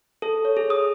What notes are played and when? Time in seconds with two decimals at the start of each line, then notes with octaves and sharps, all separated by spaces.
0.22 A4
0.45 C#5
0.57 G#4
0.70 D#6